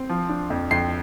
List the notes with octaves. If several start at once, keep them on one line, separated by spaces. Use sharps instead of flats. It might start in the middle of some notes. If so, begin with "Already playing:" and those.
Already playing: C4
F3
D4
F2
F2 C7